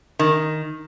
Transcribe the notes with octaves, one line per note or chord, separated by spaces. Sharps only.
D#3